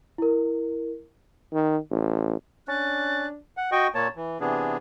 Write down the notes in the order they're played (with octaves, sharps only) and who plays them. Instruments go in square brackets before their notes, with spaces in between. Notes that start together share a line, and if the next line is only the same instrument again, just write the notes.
[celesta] E4 A#4
[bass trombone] D#3
A1
[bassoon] C#4 [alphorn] D4 [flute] F#6 [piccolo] A6
[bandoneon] F#5
F#4 D#5 G5 C#6
A#2 A#3 C#5 A5
E3
C3 E3 B3 D4 G#4